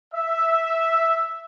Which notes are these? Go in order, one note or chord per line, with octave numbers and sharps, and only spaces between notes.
E5